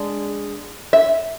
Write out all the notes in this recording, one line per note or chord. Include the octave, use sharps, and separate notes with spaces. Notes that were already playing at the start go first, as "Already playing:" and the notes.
Already playing: G#3 D4
E5